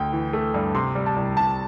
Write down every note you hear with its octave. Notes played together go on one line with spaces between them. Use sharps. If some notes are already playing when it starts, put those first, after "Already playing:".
Already playing: D2 G5
E3
A3
G2
C3 C6
G3
A5
C2
C3 A5